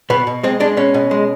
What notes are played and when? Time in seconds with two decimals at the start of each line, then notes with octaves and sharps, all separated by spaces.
0.10 B2 B3
0.27 B2
0.43 G#3 C4
0.60 G#3 D4
0.77 B2 C#4
0.94 B2
1.11 G#3